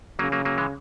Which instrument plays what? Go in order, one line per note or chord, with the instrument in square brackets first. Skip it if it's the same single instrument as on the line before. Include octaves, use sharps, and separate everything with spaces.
[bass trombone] C#3 [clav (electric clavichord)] F#3 A#3
[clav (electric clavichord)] F#3 A#3
F#3 A#3
E3 G#3